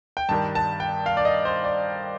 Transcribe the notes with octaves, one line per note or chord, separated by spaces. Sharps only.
G5
G2 D#3 G3 A5
A5
G5
F5
D5
D#5
C5
D5